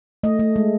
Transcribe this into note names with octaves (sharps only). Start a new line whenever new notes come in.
A3 D#5
A3
G#3